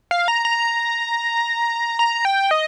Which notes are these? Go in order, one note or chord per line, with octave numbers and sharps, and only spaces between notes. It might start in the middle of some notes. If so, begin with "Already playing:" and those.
F5
A#5
A#5
A#5
G5
D#5